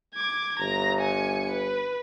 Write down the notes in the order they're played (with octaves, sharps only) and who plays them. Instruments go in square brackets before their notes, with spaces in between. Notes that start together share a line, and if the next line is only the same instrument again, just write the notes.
[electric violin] D6 G#6
[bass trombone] G1 [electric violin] A#5
[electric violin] G#5 C#7
B4